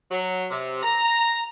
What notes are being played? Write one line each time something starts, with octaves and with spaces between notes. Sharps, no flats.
F#3
C3
A#5